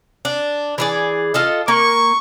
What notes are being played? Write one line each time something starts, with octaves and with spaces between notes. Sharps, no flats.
D4
E3 G#4 D5
F4 A4 D#5
A#3 C#6